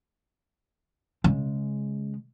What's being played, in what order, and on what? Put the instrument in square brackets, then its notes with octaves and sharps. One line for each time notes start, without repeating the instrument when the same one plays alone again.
[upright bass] C#3 G#3